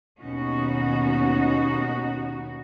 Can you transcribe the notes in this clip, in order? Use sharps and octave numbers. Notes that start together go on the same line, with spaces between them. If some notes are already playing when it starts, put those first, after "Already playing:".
D#2 B2 C#4 D#4 F#4